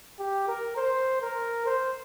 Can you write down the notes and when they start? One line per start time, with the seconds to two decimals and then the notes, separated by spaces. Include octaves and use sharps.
0.19 G4
0.48 A#4
0.77 C5
1.22 A#4
1.66 C5